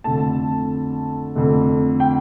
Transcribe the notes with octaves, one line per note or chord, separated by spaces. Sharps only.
F2 D3 A3 A5
F2 D3 A3
G5